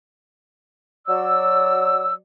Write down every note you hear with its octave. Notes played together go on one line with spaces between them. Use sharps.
F#3 D5 E6